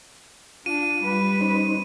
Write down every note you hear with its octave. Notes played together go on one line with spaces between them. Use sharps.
D4 F4 D#7
G3 B4
C#4 D#4 C5